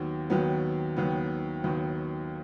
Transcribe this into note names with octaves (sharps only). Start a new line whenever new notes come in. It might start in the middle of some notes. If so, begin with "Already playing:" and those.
Already playing: D#2 D#3 F#3 B3
D#2 D#3 F#3 B3
D#2 D#3 F#3 B3
D#2 D#3 F#3 B3